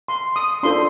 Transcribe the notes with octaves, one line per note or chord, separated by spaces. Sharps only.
C6
D#6
D4 F4 A4 C5 C6